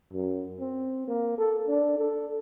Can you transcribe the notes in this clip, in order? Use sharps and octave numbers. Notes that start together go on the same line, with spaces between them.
F#2
C4
A#3
A4
D4
A4